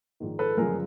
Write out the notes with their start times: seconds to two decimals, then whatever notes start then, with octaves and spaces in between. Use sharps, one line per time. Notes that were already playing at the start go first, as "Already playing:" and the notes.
0.20 A#1 G#2 D#3
0.39 A4 B4
0.57 G1 F#2 C#3 F3 G#3 G#4 A#4